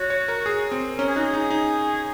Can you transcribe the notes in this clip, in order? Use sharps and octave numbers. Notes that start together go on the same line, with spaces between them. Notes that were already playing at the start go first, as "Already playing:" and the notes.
Already playing: F#4 C#5
C#5
A#4
G#4
C4
C#4 A#4
G#4
D#4 F#4
G#4
D#4
D#4